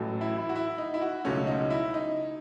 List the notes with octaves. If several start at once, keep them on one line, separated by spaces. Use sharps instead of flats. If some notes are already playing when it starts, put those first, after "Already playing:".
Already playing: A1 A2 F#3 A3
E4
E4
F#4
E4
D#4
E4
F#4
C#2 B2 F#3 A3 C#4
D#4
E4
D#4